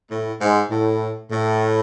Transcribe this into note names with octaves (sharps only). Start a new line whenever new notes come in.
A2
G#2
A2
A2